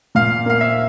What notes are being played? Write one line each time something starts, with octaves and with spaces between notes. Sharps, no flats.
A#2 F5
A#3 F5
E5